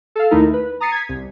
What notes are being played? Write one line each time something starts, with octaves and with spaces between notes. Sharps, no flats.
A4 F5
D#2 D#3 A3 D#4 E4 A#4
B4
A#5 D#6 A6 C7 C#7 D#7
G#6 B6
C2